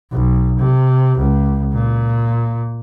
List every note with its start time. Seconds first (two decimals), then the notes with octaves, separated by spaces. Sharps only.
0.12 B1
0.59 C3
1.18 C#2
1.74 A#2